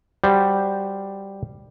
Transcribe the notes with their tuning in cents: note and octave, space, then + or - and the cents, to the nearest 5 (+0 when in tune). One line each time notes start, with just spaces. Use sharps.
G3 +0 F#4 +0 C5 +0